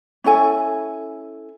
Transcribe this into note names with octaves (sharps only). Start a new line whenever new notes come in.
C#4 E4 A4 G#5